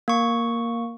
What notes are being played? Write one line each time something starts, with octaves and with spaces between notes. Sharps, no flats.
A#3 C#6